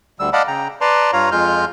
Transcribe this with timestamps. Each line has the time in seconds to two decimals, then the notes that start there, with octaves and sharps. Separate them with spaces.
0.20 D2 D3 G3 E6
0.33 D5 D#5 F5 F#5 A5 B5
0.48 C#3 G5 A#5
0.81 B4 D5 A5 A#5 C6
1.13 G2 F4 C#5 F5 A#5
1.32 F2 G#3 F4 F6 G6